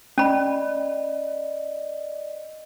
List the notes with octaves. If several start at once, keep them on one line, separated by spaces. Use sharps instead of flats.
C#4 D5 D#5 B5